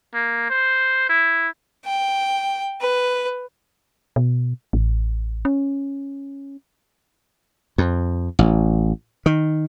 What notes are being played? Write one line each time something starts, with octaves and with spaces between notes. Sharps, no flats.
A#3
C5
E4
G5
B4
B2
A1
C#4
F2
A1
D#3